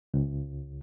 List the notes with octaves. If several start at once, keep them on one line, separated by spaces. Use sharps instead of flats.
C#2